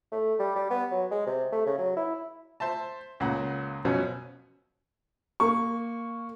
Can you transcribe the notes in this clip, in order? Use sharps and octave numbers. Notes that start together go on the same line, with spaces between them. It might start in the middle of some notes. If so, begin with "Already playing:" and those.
A3
G3
G3
B3
F#3
G#3
C3
A3
C#3
F#3
E4
C5 E5 A5
C#2 A#2 F#5
F#2 B2 F3 C#4
A#3 C#6